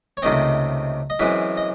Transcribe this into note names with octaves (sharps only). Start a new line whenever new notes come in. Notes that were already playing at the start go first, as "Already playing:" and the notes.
C#5
C#2 C3 D#3 A3 C4 D#5
D#5
F#2 E3 G#3 C4 E5
D#5